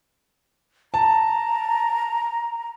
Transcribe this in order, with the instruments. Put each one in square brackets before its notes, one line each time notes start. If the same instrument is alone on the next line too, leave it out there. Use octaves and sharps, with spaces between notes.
[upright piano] A5 [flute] A#5